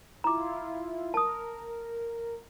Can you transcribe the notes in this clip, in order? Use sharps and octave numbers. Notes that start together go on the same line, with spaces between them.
E4 F4 A#5 D6
A#4 A5 D#6